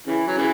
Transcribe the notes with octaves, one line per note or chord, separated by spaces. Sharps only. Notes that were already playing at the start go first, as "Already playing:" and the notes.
C#3 E3
F#3
C#3 E3